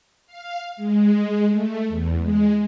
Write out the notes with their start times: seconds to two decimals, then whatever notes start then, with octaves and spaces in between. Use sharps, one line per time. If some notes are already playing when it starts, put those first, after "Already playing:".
0.26 F5
0.77 G#3
1.51 A3
1.88 E2
2.20 G#3